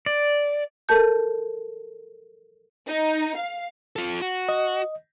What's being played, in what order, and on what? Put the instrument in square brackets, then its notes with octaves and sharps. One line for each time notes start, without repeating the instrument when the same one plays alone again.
[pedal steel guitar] D5
[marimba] A4 A#4 A5 G6
[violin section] D#4
F5
[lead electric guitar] F4 A4
F#4
[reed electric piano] D#5